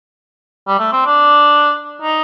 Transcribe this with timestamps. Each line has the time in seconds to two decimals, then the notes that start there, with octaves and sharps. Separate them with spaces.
0.67 G3
0.79 A3
0.92 C4
1.06 D4
2.02 D#4